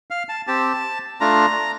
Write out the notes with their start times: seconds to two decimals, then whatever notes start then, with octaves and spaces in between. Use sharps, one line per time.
0.10 F5
0.29 A5
0.47 C4 G4 A5
1.20 A3 D4 F4 A#5